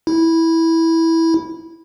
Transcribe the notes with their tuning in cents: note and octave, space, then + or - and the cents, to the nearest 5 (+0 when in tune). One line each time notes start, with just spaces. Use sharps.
E4 -10